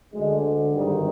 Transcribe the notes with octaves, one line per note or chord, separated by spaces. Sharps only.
D2 G#3
D3
G#1 G2 D#3 G3